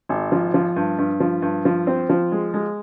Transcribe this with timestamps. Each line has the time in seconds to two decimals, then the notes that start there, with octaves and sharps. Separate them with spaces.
0.09 G#1
0.32 F3
0.54 F3
0.76 G2
0.98 G2
1.20 F3
1.42 G2
1.65 F3
1.87 C4
2.09 F3
2.32 G#3
2.54 G#3